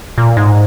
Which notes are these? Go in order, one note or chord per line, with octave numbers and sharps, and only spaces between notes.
A#2
G#2